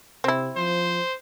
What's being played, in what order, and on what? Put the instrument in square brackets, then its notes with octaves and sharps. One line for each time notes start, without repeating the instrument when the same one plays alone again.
[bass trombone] C3 [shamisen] C4 E4
[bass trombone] F3 [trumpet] C5